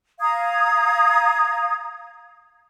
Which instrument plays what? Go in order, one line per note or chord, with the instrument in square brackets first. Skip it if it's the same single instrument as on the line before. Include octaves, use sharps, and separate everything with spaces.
[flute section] F5 A#5 D#6 G#6